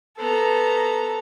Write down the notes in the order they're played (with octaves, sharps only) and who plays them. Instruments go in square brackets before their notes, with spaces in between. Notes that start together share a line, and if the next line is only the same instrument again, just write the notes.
[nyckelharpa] B3 C5 [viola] A4 A#5